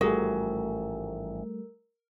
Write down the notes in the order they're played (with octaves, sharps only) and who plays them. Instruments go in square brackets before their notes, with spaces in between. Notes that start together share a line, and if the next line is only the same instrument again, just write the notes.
[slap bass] A1 G#2 F3 [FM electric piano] G3 A3 [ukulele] F#4 G#4 [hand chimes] A#4